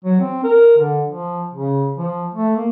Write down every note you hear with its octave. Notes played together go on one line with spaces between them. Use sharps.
F#3
C4
A#4
D3
F3
C#3
F3
A3
A#3